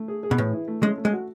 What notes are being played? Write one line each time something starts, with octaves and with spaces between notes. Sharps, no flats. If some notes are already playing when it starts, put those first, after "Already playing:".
Already playing: A3
G#4
G#4
B2
A2 E3
E4
A3
G#3 C#4
A3
G#3
F#4